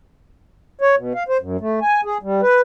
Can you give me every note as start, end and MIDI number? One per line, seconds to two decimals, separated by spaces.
0.81 0.95 73
0.97 1.13 47
1.15 1.23 77
1.29 1.37 72
1.41 1.57 42
1.61 1.79 57
1.82 2.01 80
2.05 2.18 68
2.23 2.41 55
2.42 2.61 71